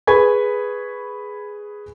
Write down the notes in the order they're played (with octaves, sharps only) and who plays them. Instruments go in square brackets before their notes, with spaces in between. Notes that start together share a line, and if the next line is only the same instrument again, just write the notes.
[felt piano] G#4 B4 G#5 B5 C#6 G#6